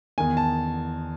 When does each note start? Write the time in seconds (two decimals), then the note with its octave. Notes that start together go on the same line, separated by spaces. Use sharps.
0.18 E2 D#3 G#5
0.37 A5